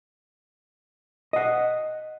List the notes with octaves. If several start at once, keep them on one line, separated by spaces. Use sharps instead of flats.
D#5 F#5